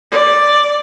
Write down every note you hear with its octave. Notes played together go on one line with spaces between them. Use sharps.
D5